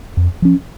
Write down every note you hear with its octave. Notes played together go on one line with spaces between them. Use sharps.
F2
F3 C#4